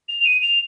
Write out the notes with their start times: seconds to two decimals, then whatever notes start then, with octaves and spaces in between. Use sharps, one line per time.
0.09 F7
0.20 F7
0.25 D#7
0.42 F7